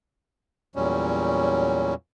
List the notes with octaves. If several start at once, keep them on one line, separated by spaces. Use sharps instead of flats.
E2 A#2 F#3 G3 C#4